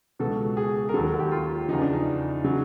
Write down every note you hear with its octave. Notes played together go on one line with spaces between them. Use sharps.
C#2 B2 F#3 A4
G#4
A#4
D#2 D#3 F#3 A4
A4
F#4
G4
F4
E2 C#3 F3 D#4
D4
D#4
C#3 F#3